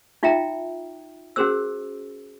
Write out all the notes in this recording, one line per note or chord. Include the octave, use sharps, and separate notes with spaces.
D#4 F4 E5 G5 A#5
C#4 F#4 G#4 A#4 C5 E6